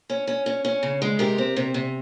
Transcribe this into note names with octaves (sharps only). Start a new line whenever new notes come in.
C#4
C#4
C#4
C#4
C#3
G#3
C3 G4 A#4
C4
C3
C3